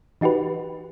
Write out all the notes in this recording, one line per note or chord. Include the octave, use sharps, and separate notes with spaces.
E3 D#4 F#4 G4 B4